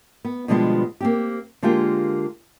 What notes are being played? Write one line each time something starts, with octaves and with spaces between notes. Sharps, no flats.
B3
B2 D3 F3 G3 G#3 B3
A#3 C4 G4
D3 G#3 A#3 F4 G4 G#4